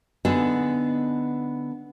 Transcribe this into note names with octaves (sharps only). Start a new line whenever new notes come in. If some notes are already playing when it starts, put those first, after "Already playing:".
D3 B3 D4 D#4 G#4 A4